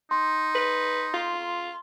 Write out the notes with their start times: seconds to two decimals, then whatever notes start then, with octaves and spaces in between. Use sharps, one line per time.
0.11 D#4 C6
0.55 B4
1.14 F4